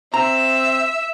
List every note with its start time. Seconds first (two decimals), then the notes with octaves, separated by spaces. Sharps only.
0.14 C4 E5 A#5